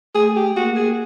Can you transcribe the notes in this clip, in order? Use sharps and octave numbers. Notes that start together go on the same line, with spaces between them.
A3 G#4
G4
A#3 F#4
G#4